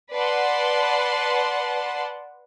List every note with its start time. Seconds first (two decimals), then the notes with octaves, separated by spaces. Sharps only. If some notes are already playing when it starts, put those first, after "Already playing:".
0.12 B4 D5 F#5 A5 C6